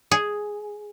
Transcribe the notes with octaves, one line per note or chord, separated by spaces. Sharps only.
G#4